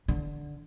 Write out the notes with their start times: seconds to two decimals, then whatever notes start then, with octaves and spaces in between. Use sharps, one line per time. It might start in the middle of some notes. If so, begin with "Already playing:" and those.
0.08 D3